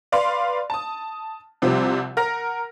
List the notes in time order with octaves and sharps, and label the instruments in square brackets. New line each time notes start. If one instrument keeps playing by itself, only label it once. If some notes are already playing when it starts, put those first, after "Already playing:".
[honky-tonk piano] B4 D5 F5 C6
A5 D#6
C2 C3 F3 G3 C4
A#4 F#5 F6 A#6